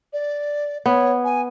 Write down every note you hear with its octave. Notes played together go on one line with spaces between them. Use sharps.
D5
B3 C#5
G#5